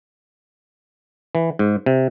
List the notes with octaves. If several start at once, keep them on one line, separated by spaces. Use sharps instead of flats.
E3
G#2
C3